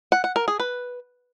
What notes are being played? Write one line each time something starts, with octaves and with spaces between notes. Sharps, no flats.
F#5
F#5
A#4
G#4
B4